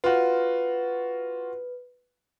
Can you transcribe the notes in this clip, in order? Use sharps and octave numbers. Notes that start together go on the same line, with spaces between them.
F4 F#4 B4